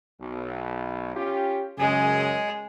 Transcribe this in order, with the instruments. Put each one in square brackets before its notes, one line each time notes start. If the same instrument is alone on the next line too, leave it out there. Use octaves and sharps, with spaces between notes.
[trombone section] B1
C#4 F4 G4
[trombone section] F#2 [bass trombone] C#3 [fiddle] G#3 G#4